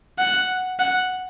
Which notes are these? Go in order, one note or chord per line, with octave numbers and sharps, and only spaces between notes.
F#5
F#5